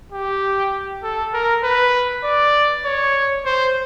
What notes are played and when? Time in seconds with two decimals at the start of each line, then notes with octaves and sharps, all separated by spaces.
0.12 G4
1.03 A4
1.34 A#4
1.63 B4
2.24 D5
2.85 C#5
3.46 C5